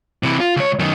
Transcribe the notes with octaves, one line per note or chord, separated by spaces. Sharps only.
C3 E3
F4
C#2 C#5
F#2 D#3